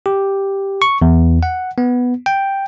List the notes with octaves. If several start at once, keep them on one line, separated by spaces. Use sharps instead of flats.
G4
C#6
E2
F#5
B3
G5